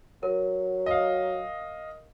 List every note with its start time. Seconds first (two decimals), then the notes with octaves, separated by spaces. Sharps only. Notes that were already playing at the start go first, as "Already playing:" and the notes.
0.23 F#3 A#4
0.86 D#5 F5